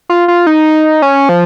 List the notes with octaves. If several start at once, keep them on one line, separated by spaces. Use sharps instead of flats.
F4
F4
D#4
C#4
F3